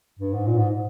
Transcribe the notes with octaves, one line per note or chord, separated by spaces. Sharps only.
G2
G#2
A#2
G#2